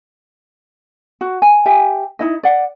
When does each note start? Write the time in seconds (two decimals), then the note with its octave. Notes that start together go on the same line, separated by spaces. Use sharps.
1.21 F#4
1.42 G#5
1.66 G4 E5 G#5
2.19 D#4 E4 D#5
2.43 D5 F#5